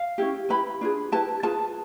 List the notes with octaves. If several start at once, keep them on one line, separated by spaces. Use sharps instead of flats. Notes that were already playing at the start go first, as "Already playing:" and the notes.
Already playing: F5
C#4 E4 G4
E4 G4 B4 B5
D4 F4 G#4
E4 G4 B4 A5
F4 G#4 B4 A5